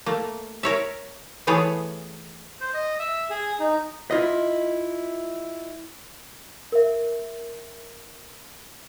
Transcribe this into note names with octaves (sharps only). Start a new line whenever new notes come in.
A3 A#3
A#4 C#5 E5
E3 A3 B3 G#4 C#5
C5
D#5
E5
G#4
D#4
E4 F4 D#5
A#4 E5